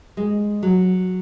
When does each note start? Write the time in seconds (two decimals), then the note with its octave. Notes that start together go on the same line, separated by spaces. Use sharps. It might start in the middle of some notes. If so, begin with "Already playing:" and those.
0.17 G#3
0.63 F#3